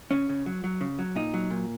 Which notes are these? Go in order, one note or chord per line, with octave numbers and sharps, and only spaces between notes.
C#3 C#4
C#3
F#3
F#3
C#3
F#3
A#2 D#4
F#3
A#2